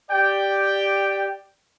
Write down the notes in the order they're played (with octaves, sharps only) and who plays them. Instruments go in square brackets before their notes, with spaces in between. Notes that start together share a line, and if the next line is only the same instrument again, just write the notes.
[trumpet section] G4 D5 G5